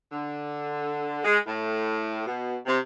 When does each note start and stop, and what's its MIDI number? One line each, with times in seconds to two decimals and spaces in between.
0.12 1.20 50
1.24 1.38 56
1.46 2.23 45
2.27 2.57 47
2.66 2.79 48